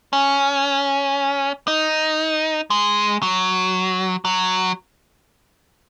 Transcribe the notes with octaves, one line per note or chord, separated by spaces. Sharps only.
C#4
D#4
G#3
F#3
F#3